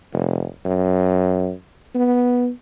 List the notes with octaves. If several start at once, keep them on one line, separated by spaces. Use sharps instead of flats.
F1
F#2
B3